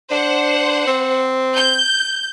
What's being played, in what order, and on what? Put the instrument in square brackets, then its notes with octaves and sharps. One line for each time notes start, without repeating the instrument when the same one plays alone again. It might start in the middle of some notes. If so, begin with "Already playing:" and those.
[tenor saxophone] D4 [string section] C5 F#5
[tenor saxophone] C4
[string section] G6